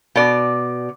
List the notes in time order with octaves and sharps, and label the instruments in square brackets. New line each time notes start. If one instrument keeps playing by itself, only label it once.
[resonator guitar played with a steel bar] B2 D5